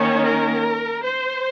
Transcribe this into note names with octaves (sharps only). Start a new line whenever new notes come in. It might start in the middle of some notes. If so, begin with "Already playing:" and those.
Already playing: D#3 A#3 C#4 C#5
A#4
C5